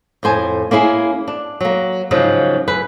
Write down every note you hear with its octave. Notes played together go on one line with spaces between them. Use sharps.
F2 A2 C5 G#5
A#3 C#4 E4 G#4
D4
F#3 A#3
G#2 C#3 F3 F#3 G#3
F#2 B4